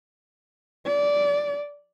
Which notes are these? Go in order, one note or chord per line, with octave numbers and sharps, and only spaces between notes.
D5